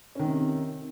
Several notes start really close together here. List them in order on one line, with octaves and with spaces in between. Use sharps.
C#4 D#3 C3